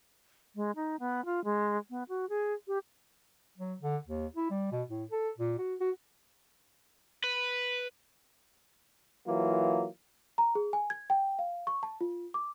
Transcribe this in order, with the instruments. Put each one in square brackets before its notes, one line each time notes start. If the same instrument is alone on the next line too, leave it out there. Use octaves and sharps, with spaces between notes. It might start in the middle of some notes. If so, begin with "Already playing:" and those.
[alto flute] G#3
D#4
B3
F4
G#3
B3
F#4
G#4
G4
[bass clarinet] F#3
D3
D#2
E4
G3
B2
A2
A4
A#2
F#4
F#4
[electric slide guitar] B4
[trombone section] E3 F#3 A#3 F4
[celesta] A#5
G#4
G#5
G#6
G5
F5
C#6
A5
F4
D6